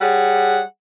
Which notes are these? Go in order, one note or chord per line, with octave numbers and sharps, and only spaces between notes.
G3 G#4 C#5 F#5